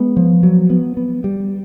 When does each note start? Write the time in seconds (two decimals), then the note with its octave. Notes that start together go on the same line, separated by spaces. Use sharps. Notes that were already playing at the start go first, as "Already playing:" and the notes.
Already playing: G#3 B3
0.17 F3
0.43 F#3
0.70 B3
0.97 B3
1.24 G3